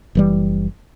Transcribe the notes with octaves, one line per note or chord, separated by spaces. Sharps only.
F#1 E3 G3